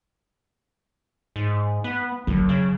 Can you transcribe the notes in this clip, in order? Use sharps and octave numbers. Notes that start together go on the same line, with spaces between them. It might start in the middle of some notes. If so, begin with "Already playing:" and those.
G#2
B3
F#1 F#3
C#3